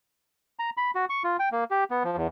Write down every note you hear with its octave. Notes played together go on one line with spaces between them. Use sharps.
A#5
B5
F#4
C#6
F4
G5
A#3
G4
B3
F3
E2